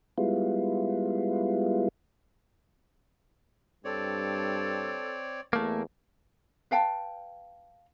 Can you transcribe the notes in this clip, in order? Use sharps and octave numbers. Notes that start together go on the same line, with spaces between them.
G3 G#3 B3 E4 F4
G2 C4 A4 C#5 D5
E2 A3 A#3
B4 F5 G5 A5